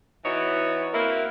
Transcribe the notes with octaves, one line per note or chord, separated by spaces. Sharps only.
E3 B3 D#4 E4 F#4 C#5
A#3 C4 E4 F#4 A#4